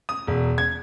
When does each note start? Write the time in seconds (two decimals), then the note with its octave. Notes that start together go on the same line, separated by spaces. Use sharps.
0.09 D#6
0.27 E1
0.58 G#6